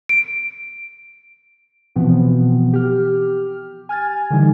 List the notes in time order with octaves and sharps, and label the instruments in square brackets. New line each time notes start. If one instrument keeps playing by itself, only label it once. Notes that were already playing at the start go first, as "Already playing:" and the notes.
[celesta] D7
[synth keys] B2 E3 F3 B3 C4
G4 F6
G#5 F6 G#6 A6
D3 E3 G3 D#4